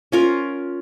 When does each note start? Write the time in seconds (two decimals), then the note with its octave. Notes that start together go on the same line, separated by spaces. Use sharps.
0.12 C#4 F4 A#4